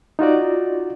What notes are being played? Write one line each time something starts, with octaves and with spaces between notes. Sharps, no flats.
D#4 F4 F#4 D5